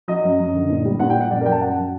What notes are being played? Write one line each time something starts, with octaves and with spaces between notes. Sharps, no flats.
F#3 D#5
F#2
F#2
D3
A#2
G3
A#2 F#5
G5
G3
F#5
F#2 D5
A#4
F#3 G5
A5
F#2 F#5
F#3